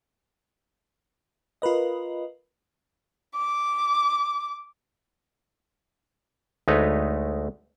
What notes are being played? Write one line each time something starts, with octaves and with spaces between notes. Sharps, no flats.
F4 A#4 B4 D#5
D6
D2 G#3 A3 D#4 B4 C#5